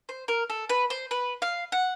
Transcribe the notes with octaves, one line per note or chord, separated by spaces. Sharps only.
C5
A#4
A4
B4
C5
B4
F5
F#5